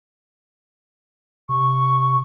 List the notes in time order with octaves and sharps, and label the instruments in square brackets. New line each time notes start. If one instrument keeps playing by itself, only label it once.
[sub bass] C3 [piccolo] C#6